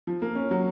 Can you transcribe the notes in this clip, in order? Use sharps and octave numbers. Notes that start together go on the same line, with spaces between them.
F3
A#3
C#4
F#3